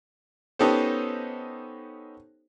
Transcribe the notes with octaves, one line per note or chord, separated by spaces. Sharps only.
B3 C#4 D#4 G4 A4 C5